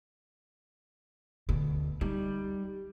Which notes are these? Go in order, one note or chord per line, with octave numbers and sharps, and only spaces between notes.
D2 B2
G3 D#4